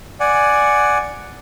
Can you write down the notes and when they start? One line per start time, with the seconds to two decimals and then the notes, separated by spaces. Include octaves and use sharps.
0.20 D5 F#5 G#5